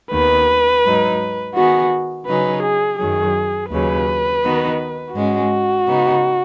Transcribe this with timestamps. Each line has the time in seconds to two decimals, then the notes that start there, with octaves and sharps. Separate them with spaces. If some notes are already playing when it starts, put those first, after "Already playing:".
0.11 D#2 D#3 B3 B4
0.84 G#2 F#3 D#4
1.55 D#3 B3 F#4 G#4
2.26 C#3 F#3 D#4 G#4 B4
2.62 G#4
2.99 F#2 D#3 F#3 G#4
3.70 D#2 C#3 F#3 B4
4.42 D#3 B3 D#4 F#4
5.14 G#2 G#3 C#4 F#4
5.86 C#3 B3 D#4